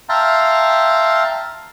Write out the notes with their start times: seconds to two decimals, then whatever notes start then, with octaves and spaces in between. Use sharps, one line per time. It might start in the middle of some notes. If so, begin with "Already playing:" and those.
0.09 E5 F5 G5 A5 A#5 C6